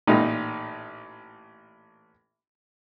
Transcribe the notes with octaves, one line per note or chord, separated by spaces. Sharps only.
A1 A#2 D#4